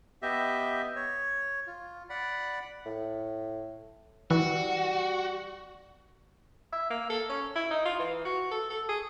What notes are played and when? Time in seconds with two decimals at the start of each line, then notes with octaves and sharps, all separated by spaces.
0.22 B3 G4 D#5 E5
0.96 C#5
1.67 F4
2.10 D5 F#5 B5
2.86 A2
4.31 E3 G3 F#4
6.73 E5
6.90 A#3
7.10 A4
7.29 C#4
7.55 E4
7.71 D#4
7.85 F4
7.99 E3
8.25 F#4
8.51 A4
8.70 A4
8.89 G#4